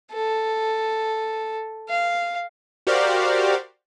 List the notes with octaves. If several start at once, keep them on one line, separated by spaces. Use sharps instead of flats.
A4
F5
F#4 G4 A#4 C5 D5 F5